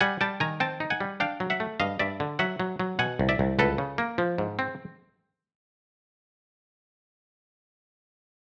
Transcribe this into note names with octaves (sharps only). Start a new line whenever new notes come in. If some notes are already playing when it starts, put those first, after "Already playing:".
G3 F#5 G#5
G3 G5 A5
D#3 G#5 A#5
C4 G5 A5
D#4
F#5 G#5
G3
D4 F5 G5
F#3
E5 F#5
A3
G2 D#5 F5
G2 D5 E5
D3
F#3 E5 F#5
F#3
F#3
B2 F#5 G#5
C2
D5 E5
C2
C#2 A4 B4
C#3
A#3
F3
G#2
C4